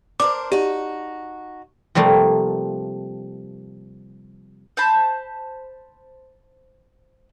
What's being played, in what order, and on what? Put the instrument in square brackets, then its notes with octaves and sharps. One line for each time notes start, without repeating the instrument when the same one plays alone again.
[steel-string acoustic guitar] D4 A#4 C5 [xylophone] D6
[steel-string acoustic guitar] D#4 F#4 [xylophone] G4
[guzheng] C3 F3 G3 A3 A#3
[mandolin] C5 A5 B5